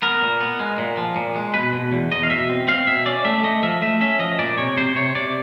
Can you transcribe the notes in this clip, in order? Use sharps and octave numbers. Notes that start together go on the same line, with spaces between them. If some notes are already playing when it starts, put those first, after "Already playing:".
B3 A#4
A#2
B3
G#3
A#2
F3
A#2
G#3
B2 B4
B2
E2
E2 D#5
F5
B2 E5
C4
C4 F5
B2 E5
C#4 D5
A3 E5
A3 D#5
F3 E5
A3 E5
C#4 E5
F3 D#5
A#2 D5
C3 C#5
C3 C5
C3 C#5
C3 D5